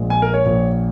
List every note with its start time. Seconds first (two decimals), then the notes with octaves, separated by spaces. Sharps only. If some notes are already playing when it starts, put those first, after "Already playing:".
Already playing: A#1 A#2 G#3
0.10 G#5
0.22 A#4
0.34 C#5
0.46 A#1 A#2 A#3